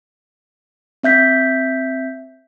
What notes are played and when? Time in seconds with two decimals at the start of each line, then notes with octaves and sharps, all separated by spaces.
1.03 C4 E5 G6 B6